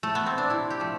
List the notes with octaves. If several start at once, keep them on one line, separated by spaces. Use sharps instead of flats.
A3
B3
C4
D4
C3 E4
G4
F3 A3